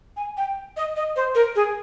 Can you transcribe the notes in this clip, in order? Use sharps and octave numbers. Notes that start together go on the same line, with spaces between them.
G#5
G5
D#5
D#5
C5
A#4
G#4